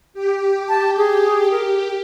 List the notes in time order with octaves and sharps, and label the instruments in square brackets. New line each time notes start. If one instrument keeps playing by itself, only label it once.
[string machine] G4
[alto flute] A5
G#4
A#4